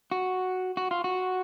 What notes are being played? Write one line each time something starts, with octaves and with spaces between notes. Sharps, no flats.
F#4
F#4
F4
F#4